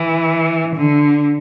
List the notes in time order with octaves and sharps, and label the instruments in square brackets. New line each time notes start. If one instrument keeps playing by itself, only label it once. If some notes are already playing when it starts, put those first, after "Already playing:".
Already playing: [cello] E3
D3